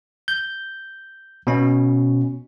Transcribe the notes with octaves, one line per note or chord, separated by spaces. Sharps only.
G6
B2 C#4